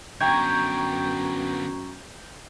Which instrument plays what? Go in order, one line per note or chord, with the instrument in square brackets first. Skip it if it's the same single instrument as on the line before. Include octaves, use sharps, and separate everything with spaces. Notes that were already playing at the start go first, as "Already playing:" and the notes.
[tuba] F#2 [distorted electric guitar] D3 B3 [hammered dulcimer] G5 [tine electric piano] A#5 C#6 G#6